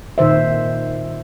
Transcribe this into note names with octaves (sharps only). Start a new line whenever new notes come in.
A#2 D#3 C5 E5